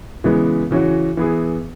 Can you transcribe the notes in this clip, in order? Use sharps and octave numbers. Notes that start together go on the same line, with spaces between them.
C#3 E3 G#3 B3
C#3 E3 C#4 F#4
E3 B3 E4 G#4